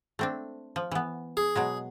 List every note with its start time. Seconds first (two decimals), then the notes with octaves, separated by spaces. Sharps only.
0.19 A3 C4 D4
0.76 F3
0.91 E3 B3
1.37 G#4
1.56 B2 F#3 G#3